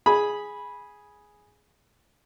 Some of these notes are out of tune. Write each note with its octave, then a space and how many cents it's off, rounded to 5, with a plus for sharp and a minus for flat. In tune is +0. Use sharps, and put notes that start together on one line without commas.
G#4 +0 B5 -10